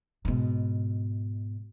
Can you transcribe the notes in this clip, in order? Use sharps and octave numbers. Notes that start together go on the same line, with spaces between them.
G#2 B2